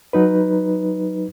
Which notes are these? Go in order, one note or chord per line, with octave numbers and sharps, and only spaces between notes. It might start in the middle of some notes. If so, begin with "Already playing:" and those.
F#3 D#4 B4